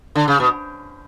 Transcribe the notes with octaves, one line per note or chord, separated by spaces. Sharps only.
D3
C#3
B2